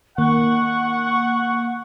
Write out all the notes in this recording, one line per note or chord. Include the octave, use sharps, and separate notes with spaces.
D#3 A#3 F#5 C#6